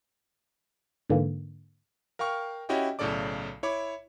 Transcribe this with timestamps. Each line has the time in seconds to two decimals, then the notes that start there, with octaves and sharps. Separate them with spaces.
1.10 G#2 D3 E3 A#3
2.19 A#4 F5 G5 C#6 F6
2.69 C#4 E4 F#4 G4 D#5 G5
2.99 B1 A2 C#3 A4 D5 D6
3.63 E4 C#5 B5 D6